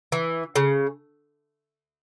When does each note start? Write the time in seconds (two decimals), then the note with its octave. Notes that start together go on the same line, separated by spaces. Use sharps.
0.12 E3
0.56 C#3